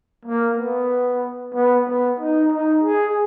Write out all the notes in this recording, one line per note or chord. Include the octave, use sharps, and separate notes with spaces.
A#3
B3
B3
B3
D#4
D#4
G#4